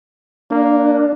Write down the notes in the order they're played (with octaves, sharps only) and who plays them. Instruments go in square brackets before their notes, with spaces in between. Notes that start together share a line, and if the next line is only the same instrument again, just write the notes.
[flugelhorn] A#3 [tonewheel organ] D4